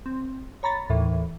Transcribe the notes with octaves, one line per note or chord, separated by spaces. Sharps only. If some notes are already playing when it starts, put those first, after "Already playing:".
C4
C#5 A#5 B5 A6
D#2 A2 E3